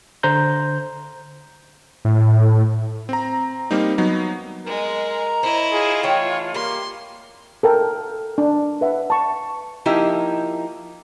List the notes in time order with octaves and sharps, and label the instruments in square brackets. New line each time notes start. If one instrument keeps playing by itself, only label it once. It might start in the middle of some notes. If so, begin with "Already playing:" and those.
[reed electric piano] D3 C5 A#5 G6
[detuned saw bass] A2
[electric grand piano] C4 A#5
G3 A#3 C4 D#4
F#3 B3 D#4
[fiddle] G#3 [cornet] A#4
[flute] A#5
[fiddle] E4 D#5 [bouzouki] C5 C#5
[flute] F4 [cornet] G#4
[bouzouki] E3 A3 G5 [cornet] C#5
[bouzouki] G3 [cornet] A#3 [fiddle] C6
[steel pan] A4 A#4 G5
D4
B4 E5 F#5
A5 C#6
[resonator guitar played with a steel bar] F3 A#3 D#4 E4 G4